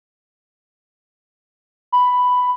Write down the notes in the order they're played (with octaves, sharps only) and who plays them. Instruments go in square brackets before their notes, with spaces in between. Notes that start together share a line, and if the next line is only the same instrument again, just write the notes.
[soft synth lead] B5